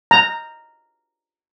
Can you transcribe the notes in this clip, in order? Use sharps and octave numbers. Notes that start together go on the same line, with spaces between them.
A#5